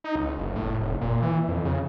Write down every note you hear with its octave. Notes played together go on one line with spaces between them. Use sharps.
D#4
C#2
F#1
A2
F1
A#2
E3
F2
C#3